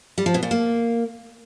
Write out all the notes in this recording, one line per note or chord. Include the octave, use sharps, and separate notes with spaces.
G3
F3
B2
A#2
A#3